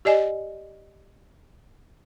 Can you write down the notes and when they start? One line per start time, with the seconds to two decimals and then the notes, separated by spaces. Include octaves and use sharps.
0.05 G4 D5 D#5 G#5